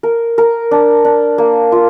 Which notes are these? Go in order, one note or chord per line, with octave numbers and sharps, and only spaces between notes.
A#4
A#4
D4
D4
A#3
F4